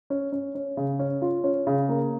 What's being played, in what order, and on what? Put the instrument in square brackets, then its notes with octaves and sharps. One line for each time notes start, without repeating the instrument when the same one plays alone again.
[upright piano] C#4
C#4
C#4
C#3
C#4
F4
C#4
C#3
A#3